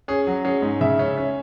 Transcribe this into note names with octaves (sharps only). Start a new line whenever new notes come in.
C#4 G#4
F#3
C#4 G#4
G#2
C#3 E5
C#4
C#4